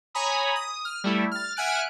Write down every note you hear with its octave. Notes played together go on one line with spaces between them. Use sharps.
C#5 G#5 A#5 B5 D#6
D#6
F6
G3 A3 E4
F6 A6
E5 F#5 G#5 F6 F#6 D7